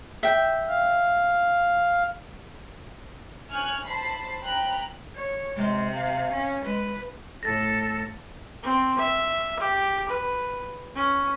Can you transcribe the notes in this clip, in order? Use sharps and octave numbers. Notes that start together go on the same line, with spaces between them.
E5 G5
F5
G#5 C#6 F6 F#6
C5 A5 B5 C7
G5 A#5 B5 F#6
C#5
C3 G#3
F5
C#4
G#3 B4
A2 A4 A6 A#6
C4
E5
G4
B4
C#4